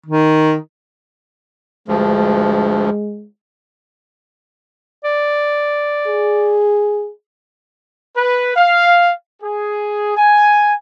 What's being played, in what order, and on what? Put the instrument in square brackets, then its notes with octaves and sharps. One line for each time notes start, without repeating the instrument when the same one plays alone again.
[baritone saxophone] D#3
[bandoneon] D2 G2 F3 [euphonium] G#3
[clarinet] D5
[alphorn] G#4
[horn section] B4
F5
G#4
G#5